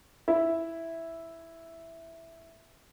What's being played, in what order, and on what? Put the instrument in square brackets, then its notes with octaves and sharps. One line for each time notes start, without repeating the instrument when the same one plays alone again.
[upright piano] E4 E5